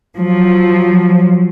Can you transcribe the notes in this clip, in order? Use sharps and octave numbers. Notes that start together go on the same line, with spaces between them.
F3 F#3